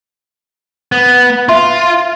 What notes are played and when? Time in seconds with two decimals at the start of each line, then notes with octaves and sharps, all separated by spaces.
0.92 B3
1.49 F4 E5 C6